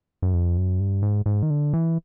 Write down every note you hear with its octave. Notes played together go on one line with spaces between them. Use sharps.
F#2
F2
F#2
G2
G#2
G#2
D#3
D3
E3